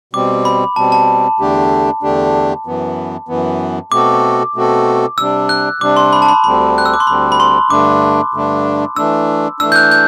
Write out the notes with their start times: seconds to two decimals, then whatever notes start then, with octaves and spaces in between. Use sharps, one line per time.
0.13 B2 G3 C4 D6
0.45 B5
0.76 B2 G3 C4 A5
0.92 A5
1.39 E2 D3 A3 D4 G4
2.02 E2 D3 A3 D4 G4
2.66 F#2 E3 B3
3.28 F#2 E3 B3
3.92 B2 A3 C4 F#4 A4 D6
4.55 B2 A3 C4 F#4 A4
5.18 C3 G3 D4 E6
5.49 F#6
5.81 C3 G3 D4 D6
5.97 C6
6.13 B5
6.22 A5
6.28 B5
6.44 D2 D3 G3 C4 B5
6.78 F#6
6.86 E6
6.93 D6
7.00 C6
7.07 D2 D3 G3 C4 B5
7.32 B5
7.40 C6
7.70 G2 D3 A3 D4 D6
8.34 G2 D3 A3 D4
8.96 E3 A3 D4 E6
9.60 E3 A3 D4 E6
9.72 G6
9.76 F#6
9.91 G6